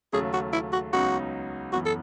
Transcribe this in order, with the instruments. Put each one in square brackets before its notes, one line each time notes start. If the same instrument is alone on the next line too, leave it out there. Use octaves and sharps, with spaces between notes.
[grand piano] D#2 C#3 F#3 A3 [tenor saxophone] G#4
[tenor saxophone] F#4
E4
F#4
[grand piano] C#2 C#3 F#3 B3 D#4 [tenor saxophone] F#4
[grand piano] F#2 E3 B3 [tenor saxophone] F#4
[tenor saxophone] A4